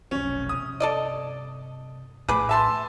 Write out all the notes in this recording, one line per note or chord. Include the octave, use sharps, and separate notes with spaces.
F1 B1 C#4
G2 C3 D#6
A4 D5 D#5
A#1 A2 G#4 B4 D6
E5 A5 C6